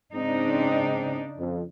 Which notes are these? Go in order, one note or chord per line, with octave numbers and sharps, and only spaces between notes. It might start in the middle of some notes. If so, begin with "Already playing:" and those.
G#2 C#3 C4 D4 D#4
F2